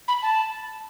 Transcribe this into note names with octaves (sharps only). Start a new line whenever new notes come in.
B5
A5